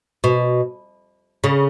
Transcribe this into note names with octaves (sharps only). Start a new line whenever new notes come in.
B2
C#3